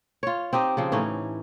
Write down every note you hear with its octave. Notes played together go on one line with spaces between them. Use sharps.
F4 C#5
C4 D#4 G4 D#5
C#3 F3 C4
A2 E3 C#4 D#4